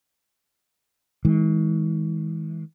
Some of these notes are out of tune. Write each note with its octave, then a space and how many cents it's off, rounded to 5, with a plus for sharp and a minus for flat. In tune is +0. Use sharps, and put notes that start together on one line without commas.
E3 -45 G#3 +0